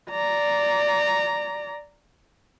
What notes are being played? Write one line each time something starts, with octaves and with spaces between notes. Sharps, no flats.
D5 A#5